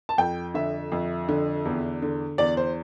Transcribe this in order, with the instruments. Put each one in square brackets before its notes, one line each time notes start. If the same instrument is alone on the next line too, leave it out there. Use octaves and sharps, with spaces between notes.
[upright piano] A5
F2 G5
D3 E5
F2
D3
E2
D3
E2 D5
C5